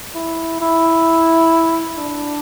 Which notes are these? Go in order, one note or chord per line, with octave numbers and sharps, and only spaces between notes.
E4
E4
D4